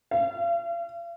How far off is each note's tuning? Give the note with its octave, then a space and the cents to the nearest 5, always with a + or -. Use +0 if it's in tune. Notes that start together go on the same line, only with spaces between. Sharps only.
F5 -40